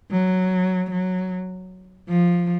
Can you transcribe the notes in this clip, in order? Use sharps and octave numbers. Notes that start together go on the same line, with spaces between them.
F#3
F#3
F3